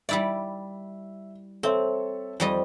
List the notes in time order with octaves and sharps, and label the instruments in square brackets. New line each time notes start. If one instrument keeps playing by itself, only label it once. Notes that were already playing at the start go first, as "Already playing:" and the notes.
[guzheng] G3 E4 D5 [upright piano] E5
[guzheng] C4 [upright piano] A4 C#5 E5
[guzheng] F2 G3 D#5